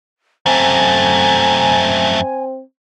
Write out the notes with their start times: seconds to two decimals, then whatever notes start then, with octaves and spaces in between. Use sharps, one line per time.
0.46 F#2 A3 C4 G#5